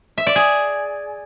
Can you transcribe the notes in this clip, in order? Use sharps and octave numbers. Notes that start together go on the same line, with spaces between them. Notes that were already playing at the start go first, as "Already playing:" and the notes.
E5
D5
G#4